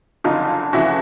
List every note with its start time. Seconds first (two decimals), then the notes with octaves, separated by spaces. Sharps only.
0.24 F#1 F2 D3 D#4 F4
0.73 F1 F2 C#3 E3 E4 F#4